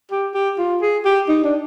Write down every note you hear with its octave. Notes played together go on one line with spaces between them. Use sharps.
G4
G4
F4
G#4
G4
D#4
D4